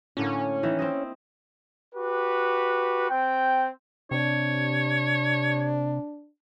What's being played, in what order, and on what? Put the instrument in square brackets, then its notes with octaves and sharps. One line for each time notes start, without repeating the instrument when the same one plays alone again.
[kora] A2 D3 A#3 [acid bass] C#4
[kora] D#3 E3 E4
C4 E4 D#5
[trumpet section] F#4 G4 B4
C4 G5
[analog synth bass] C3 [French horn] D4 [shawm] C#5